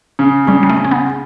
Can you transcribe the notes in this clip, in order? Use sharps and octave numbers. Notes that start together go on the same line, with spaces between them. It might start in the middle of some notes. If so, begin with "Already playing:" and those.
C#3
C#3 G3
G3
A3
C#3
C#4
B3